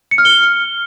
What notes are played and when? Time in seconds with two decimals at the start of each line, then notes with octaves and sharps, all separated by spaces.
0.11 C#7
0.18 F6
0.25 G7